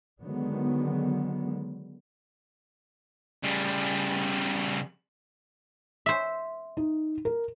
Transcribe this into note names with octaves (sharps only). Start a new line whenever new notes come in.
D3 D#3 F#3 G#3 B3
C#3 G3
C5 E5
D#4
A#4